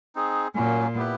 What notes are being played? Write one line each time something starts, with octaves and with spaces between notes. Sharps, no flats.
C4 D#4 G#4
A#2 F#3 A#3 C#4
B3 E4 G4 B4